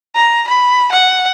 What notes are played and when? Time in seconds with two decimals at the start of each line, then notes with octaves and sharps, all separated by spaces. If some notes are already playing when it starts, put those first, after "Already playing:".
0.15 A#5
0.48 B5
0.92 F#5